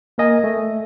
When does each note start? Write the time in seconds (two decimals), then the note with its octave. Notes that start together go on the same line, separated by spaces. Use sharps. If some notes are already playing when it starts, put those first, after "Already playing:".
0.18 A#3 A#4 D#5 G#5
0.44 A3